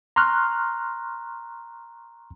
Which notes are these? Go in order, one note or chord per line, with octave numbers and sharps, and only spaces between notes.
A#5 C6 C#6 F6 F#6